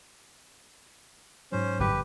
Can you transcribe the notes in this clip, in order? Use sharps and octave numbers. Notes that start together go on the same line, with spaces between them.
G#2 F#3 C#4 C5
G1 F2 A#2 G4 B4